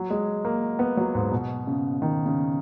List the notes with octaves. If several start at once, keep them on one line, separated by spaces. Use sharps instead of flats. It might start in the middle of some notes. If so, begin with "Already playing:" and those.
Already playing: F#3
G#3
A#3
B3
F#3
G#2
B2
C#3
D#3
C#3